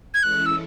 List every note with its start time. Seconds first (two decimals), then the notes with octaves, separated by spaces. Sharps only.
0.14 G#6
0.23 E3 G#3 C#4 E4 A4 F#6
0.46 E6